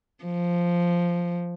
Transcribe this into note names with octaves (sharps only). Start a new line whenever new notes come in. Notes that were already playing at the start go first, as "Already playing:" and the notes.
F3